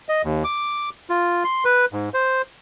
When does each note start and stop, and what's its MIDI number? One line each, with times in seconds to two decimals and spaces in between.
0.09 0.22 75
0.24 0.43 39
0.44 0.90 86
1.10 1.44 65
1.45 1.64 84
1.65 1.85 71
1.93 2.09 44
2.14 2.42 72